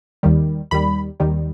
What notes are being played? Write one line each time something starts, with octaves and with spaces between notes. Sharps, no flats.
D#2 D#3 G3
D#2 D#3 G3 B5
D#2 D#3 G3